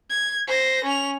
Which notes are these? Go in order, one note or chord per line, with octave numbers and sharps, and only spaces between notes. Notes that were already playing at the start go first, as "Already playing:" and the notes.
G#6
C5 A#6
C#4 F7